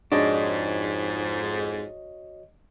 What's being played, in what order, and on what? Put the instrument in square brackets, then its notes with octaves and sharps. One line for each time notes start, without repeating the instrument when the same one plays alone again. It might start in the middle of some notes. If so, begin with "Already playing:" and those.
[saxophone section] F2 G#2 [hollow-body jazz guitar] D4 [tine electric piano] F#4 C#5 D#5